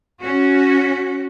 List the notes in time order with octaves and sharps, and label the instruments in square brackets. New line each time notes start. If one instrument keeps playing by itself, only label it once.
[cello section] C#4 F#4